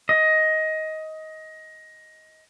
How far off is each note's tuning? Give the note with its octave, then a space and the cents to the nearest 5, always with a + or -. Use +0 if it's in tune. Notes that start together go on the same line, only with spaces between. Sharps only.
D#5 +15